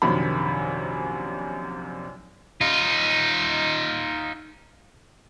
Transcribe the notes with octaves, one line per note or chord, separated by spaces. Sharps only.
A#1 F#2 C3 D#3 B5
D#4 F4